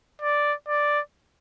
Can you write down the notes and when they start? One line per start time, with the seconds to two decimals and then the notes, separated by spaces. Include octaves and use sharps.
0.22 D5
0.68 D5